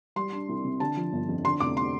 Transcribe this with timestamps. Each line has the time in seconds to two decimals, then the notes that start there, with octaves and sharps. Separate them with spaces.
0.16 G3 C6
0.32 D4
0.49 C2
0.64 C3
0.80 D3 A5
0.97 F3
1.12 G1
1.29 F2
1.45 D3 C6
1.60 F1 D6
1.77 C6